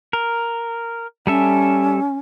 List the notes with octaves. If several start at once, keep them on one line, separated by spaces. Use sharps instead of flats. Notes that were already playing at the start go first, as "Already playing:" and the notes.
A#4
G3 C#4 A4 E5